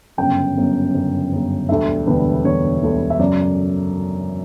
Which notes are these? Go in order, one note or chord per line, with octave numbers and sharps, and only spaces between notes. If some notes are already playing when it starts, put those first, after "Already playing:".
G1 F#2 C#3 G5
G1 F#2 C#3
G1 F#2 C#3
G1 F#2 C#3
E1 D2 D3 G3 E5
E1 D2 D3 G3 B4
E1 D2 D3 G3 C#5
E1 D2 D3 G3
E5
F#2 C#3 F#3 D5